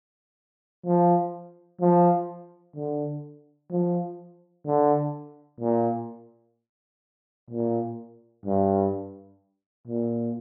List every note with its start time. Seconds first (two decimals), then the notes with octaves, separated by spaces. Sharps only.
0.86 F3
1.81 F3
2.76 D3
3.71 F3
4.66 D3
5.60 A#2
7.51 A#2
8.46 G2
9.88 A#2